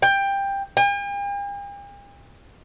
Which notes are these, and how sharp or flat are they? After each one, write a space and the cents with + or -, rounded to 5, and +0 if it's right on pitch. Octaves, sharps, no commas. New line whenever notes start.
G5 +15
G5 +45